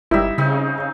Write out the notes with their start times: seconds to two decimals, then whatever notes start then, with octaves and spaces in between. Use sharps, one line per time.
0.11 G1 G3 D#4 E4 E5
0.38 C#3 C4 D#4